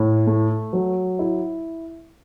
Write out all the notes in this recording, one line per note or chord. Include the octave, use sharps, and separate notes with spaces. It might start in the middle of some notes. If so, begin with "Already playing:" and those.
Already playing: A2
A3
F#3
E4